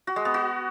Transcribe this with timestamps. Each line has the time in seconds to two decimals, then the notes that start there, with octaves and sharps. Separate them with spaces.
0.07 F#4
0.16 G#3
0.25 B3
0.34 F#4